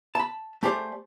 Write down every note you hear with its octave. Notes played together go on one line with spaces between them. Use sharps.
A5 B5
A3 G4 G#4 C5 D5